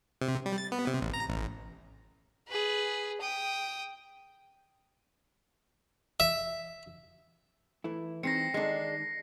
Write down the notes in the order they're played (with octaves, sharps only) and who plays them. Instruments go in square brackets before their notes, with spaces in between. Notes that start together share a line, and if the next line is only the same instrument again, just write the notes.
[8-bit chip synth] C3
G3
A6
B3
C3
A1
A#5
A1
[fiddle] G#4 B4
G5 D#6
[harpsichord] E5
[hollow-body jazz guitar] E3 A3 E4
[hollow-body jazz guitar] E3 G#3 D#4 [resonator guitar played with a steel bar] C4 [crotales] A#6 C7 C#7
[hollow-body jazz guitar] D#3 D#4 A4 [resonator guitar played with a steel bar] G#3 D4